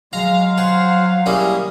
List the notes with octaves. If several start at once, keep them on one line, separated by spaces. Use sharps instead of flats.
F#3 G#3 F5 A#5
G#4 C5 F#5
G3 A#3 C#4 E4 G#4